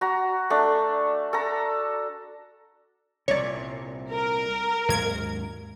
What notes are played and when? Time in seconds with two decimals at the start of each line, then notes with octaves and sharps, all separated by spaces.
0.01 F#4 A#5
0.50 A3 D4
1.33 A4 A#5
3.28 C2 A#2 C#5 D5
4.10 A#4
4.89 D#2 G#2 F#3 A#3 G#6